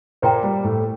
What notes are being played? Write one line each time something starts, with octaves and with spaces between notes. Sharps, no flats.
A#2 A#3 C5 G5 A#5
G3
A2 A3